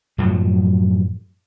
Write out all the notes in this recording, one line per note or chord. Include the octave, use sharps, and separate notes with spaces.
F#2 A2 F3 F#3